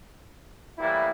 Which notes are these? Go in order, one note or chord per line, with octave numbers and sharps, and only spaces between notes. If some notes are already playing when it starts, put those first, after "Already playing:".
A2 E3 G3 A#3 E4